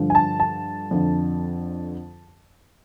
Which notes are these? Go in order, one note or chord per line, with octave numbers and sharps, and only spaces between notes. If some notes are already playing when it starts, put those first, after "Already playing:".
Already playing: G2 D3 F3
G#5
A5
A5
F2 D3 F3